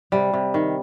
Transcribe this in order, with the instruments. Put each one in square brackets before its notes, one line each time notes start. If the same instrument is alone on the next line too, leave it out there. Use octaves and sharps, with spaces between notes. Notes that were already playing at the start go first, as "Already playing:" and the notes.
[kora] C3 G3
C3
D#3